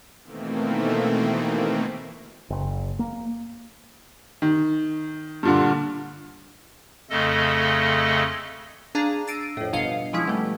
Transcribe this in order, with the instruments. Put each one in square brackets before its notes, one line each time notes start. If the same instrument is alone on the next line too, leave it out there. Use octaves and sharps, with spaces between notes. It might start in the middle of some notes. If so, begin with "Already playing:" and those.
[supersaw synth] B2 D#3 E3 A3 A#3 C4
[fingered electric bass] F#1
A#3
[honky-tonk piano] D#3
G2 A#2 D3
[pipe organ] F2 C#3 A3 A4 D#5
[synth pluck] D4 G#4 F5 A5 A#5
E6 A6 A#6 C7 D7 D#7
F2 A2
G1 B2 D#5 F5 C7 C#7
E3 F3 G#3 C#4 E4
B2 G3 A3